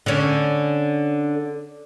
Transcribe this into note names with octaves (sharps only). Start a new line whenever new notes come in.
D3 C#4